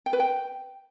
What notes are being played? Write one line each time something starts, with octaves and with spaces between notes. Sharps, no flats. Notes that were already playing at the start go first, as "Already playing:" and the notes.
G5
B4
G5